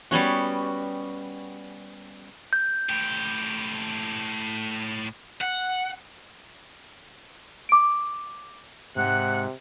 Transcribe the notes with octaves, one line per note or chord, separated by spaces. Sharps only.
G3 B3 C#4 F#4
G6
A2 G4
F#5
D6 D7
G#2 C3 F#5 F#6